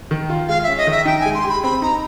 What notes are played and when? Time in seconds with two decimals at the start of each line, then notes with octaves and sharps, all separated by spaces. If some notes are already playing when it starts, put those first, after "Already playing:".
0.11 D#3
0.29 F4
0.48 G#3 F5
0.63 C#4 E5
0.77 D#5
0.87 D#3 E5
1.06 D#4 G5
1.20 G#5
1.25 G#3
1.34 C6
1.44 G4 B5
1.63 C4 B5
1.82 D#4 A#5